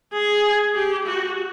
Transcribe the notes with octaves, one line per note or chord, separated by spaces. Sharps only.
G#4
G4
F#4